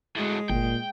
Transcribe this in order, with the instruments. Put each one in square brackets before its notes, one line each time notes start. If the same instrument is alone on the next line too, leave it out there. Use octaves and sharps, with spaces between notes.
[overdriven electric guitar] A2 F#3 [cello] G#3
[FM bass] G1 [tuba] A#2 [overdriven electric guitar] G5